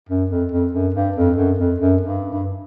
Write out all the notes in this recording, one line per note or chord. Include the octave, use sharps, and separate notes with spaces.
F#2
F2
F2
F#2
G2
F2
F#2
F2
F#2
G2
G2